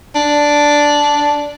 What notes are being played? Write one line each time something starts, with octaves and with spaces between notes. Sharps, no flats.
D4